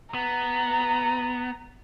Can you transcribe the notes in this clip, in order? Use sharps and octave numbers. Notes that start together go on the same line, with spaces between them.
B3 A#5